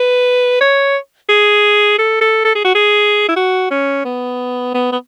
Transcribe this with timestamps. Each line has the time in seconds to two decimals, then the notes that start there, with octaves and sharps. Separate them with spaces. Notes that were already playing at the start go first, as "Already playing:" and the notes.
Already playing: B4
0.61 C#5
1.29 G#4
1.99 A4
2.21 A4
2.45 A4
2.55 G#4
2.64 F#4
2.75 G#4
3.28 E4
3.36 F#4
3.71 C#4
4.05 B3
4.74 B3
4.92 B3